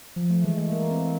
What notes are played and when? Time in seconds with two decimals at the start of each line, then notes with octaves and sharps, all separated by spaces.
0.16 F3
0.30 A3
0.44 E3 G#3
0.58 A3
0.72 A#3
0.91 C4